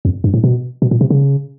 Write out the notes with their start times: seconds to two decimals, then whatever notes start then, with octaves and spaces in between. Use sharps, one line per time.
0.05 F2
0.24 G2
0.34 A2
0.44 B2
0.82 B2
0.91 A#2
1.01 C3
1.10 C#3